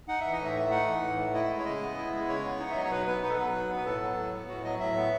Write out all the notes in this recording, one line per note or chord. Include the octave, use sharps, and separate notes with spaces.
D#4 F#5
E3 E5
D#5
A2 E5
A3 E5
D#4 F#5
E3
A2
A3
E4 D#5
D#5
G#3
C#5
C#3 D#5
B3
E4
G#3
C#3 C#5
B3
D#4 F#5
E5
F#3 D#5
C#5
B2 B4
B3 B4
D#4 B4
A4
F#3 B4
B2
B3
B4
A2 A4
F#3
A2
B3
A2 F#4
F#3 D#5
A2 E5
B3